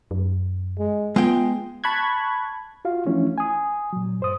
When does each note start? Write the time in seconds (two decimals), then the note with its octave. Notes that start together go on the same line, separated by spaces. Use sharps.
0.11 F#2
0.79 G#3
1.16 G#3 B3 F4 G5
1.84 A5 B5 C#6 F#6 G#6
2.85 F4 F#4 F5
3.06 E3 F3 A3 C#4 D4 E4
3.38 G#5 D#6
3.93 A#2 F#3
4.20 G2 C5 D#6